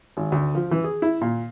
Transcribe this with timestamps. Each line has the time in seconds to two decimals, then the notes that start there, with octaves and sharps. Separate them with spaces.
0.17 G#1
0.32 D2
0.55 F3
0.71 E3
0.84 G#4
1.02 E4
1.21 A#2